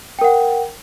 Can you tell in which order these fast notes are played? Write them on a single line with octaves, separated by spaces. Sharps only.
G5 A#4 F#5